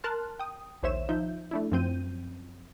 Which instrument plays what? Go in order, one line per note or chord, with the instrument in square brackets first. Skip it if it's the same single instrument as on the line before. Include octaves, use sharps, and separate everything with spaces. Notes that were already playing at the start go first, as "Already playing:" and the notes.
[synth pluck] A#4 A5 C6 F6 F#6
G5 D#6
A#1 D#2 C5 C#5 E5 E7
F3 D#4 E5 G6
A3 D4 E4
F#2 F3 C4 G6 D#7